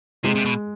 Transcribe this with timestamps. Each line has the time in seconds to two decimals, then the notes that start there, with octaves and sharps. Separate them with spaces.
0.24 C3 G#3
0.35 C3
0.45 B2